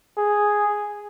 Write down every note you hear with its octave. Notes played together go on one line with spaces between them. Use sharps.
G#4